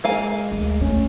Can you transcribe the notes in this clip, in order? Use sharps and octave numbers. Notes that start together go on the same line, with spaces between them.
G#3 A#3 F5 G#5
D2
A3 C#4